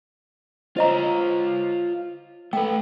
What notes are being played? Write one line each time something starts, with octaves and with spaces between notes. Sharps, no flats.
F4 C5 C#5 D#5 A#5
A3 A4 B4 G5